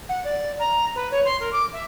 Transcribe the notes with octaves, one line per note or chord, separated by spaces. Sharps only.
F#5
D5
A#5
B4
C#5
C6
A#4
D6
E5